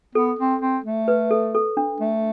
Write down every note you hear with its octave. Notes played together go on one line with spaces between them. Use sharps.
B3 A4
C4
C4
A3
B4
A4
A4
D4
A3